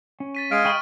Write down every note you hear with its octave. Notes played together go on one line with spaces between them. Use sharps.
C#4
A6 B6 D#7
G#3 F5 F6 D7 D#7
D#5 G5 B5 C#6